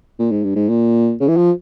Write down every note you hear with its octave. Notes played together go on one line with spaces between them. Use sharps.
A#2
G#2
G2
G#2
A#2
C#3
E3
F3